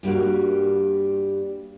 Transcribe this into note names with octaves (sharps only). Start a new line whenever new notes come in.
G2 G3 A#3 F#4